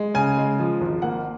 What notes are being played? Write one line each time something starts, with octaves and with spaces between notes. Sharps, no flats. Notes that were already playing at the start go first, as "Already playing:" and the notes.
Already playing: G#3
C#3 G#5
G#3
F3
G#1
A#3 F#5